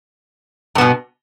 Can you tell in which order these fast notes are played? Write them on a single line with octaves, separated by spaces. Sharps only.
G2 B3 B2